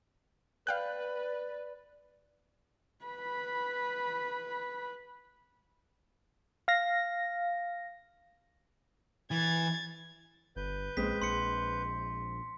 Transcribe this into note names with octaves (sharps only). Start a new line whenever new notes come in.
B4 D5 F5 G5 F#6
B4 B5
F5 A#6
E3 G#6 A6
G1 B4 G6
A#1 G#3 C4 B6
A#1 C6 C#7